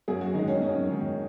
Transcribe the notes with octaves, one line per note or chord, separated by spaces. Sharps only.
F#2 G#4
F#4
D#3 G#3 D#4
C#4
F#2 C#4
D#3 G#3